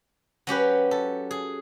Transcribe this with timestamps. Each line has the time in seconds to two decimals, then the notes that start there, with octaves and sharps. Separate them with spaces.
0.47 F#3 C#4 G4 B4
0.91 A4
1.31 G#4